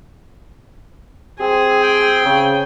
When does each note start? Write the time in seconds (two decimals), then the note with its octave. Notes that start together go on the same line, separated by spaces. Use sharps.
1.40 C4 G#4
1.83 G5
2.25 C#3